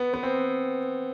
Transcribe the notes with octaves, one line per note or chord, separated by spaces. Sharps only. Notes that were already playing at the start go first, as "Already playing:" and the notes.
Already playing: B3
B3
C4